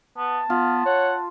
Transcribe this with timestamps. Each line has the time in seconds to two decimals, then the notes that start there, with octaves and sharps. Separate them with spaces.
0.18 B3 A5
0.50 B3 F4 F5
0.86 C#5 F#5